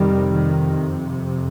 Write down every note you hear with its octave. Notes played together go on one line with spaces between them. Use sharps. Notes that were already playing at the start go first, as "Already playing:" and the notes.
Already playing: F2 C3 D#3 G3
D#3